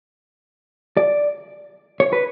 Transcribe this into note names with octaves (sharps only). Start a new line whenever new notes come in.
D5
C#5
B4